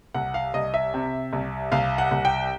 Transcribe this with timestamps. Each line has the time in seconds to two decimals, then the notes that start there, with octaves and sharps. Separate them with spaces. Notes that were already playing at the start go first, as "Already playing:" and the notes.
0.14 C2 F#5
0.34 F5
0.54 C2 D#5
0.74 E5
0.94 C3
1.33 C2
1.72 C2 F5
1.98 F#5
2.11 C2
2.25 G5